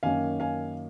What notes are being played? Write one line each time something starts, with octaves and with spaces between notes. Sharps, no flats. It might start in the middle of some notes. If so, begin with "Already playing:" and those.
F#2 D#3 A#3 C#4 F5 G#5
F5 G#5